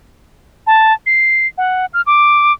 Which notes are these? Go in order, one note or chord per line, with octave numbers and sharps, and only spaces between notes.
A5
C7
F#5
F6
D6